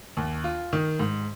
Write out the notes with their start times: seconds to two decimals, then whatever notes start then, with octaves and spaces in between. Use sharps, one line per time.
0.17 D#2
0.44 F4
0.73 D#3
0.99 G#2